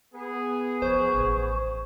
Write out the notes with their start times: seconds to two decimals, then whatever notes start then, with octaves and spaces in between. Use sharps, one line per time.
0.14 B3 G#4
0.82 F3 C5 C#6
1.14 A1